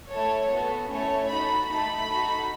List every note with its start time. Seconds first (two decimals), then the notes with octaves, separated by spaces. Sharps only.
0.12 A3 E4 A4 C#5
0.51 B3 F#4 A4
0.90 A3 C#4 E4 A4 C#5
1.29 D#4 F#4 A4 B5
1.69 A3 D#4 A4 B5
2.08 D#4 F#4 A4